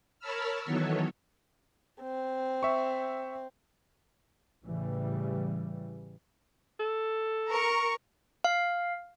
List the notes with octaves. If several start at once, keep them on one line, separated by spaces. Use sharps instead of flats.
A#4 C#5 A5 B5 E6 F6
D#3 E3 F#3 B3 A4 C#5
C4
E5 C#6
A1 C#3 E3 G3
A4
A#4 C#6
F5